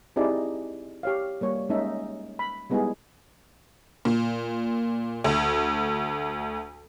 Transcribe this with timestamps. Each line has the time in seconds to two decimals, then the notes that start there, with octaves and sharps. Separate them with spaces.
0.16 C4 D#4 E4 G4 G#4 D5
1.03 G4 C#5 F5
1.41 G3 A#3 C#5
1.69 G#3 A#3 C#4 D#4 E5
2.39 B5
2.70 G3 G#3 B3 D#4 E4 G#4
4.05 A#2
5.24 D2